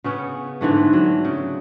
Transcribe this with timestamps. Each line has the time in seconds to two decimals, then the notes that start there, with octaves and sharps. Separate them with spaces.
0.04 C#3 B3 C#4
0.61 G#2 D3 E3 A3
0.93 F#3
1.25 C#3